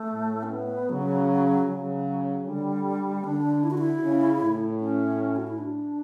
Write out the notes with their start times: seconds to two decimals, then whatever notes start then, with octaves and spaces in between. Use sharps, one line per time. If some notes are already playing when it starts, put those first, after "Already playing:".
Already playing: A3
0.12 A2
0.43 C#4
0.51 B3
0.89 C#3 F#3
1.67 C#3 F#3
2.46 D3 G3
3.24 D3 D4
3.63 E4
3.71 F#4
3.78 E4
4.02 C#3
4.41 A2
4.80 C#4
5.36 F#4
5.47 E4
5.58 D4